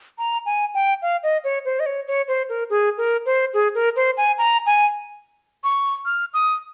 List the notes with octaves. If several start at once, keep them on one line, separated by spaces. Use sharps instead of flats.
A#5
G#5
G5
F5
D#5
C#5
C5
D#5
C#5
C#5
C5
A#4
G#4
A#4
C5
G#4
A#4
C5
G#5
A#5
G#5
C#6
F6
D#6